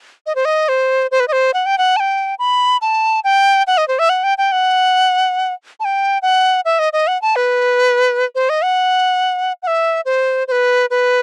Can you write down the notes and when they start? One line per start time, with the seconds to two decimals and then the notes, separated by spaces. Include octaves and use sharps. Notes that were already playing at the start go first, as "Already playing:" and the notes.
0.26 D#5
0.35 C5
0.45 D#5
0.69 C5
1.11 C5
1.20 B4
1.28 D#5
1.33 C5
1.54 F#5
1.66 G5
1.78 F#5
1.96 A5
2.00 G5
2.39 B5
2.82 A5
3.24 G5
3.67 F#5
3.78 D#5
3.88 C5
3.99 E5
4.09 F#5
4.24 G5
4.38 G5
4.52 F#5
5.80 A5
5.85 G5
6.22 F#5
6.65 E5
6.79 D#5
6.93 D#5
7.07 F#5
7.22 A5
7.36 B4
8.35 C5
8.49 D#5
8.63 F#5
9.63 F#5
9.67 E5
10.05 C5
10.48 C5
10.52 B4
10.90 B4